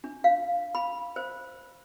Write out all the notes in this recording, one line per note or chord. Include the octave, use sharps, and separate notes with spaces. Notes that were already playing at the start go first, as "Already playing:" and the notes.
D4
F5
B5
C5